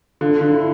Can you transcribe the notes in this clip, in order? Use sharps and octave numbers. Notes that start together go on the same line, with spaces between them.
D3 F4
D3
E4